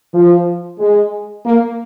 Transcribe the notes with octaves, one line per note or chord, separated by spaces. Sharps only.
F3
G#3
A#3